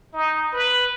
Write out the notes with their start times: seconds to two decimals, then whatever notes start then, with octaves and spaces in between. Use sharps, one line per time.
0.13 D#4
0.53 B4